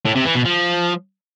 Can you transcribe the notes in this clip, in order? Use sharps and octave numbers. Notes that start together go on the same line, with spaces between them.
A2
C3
E3
B2
F3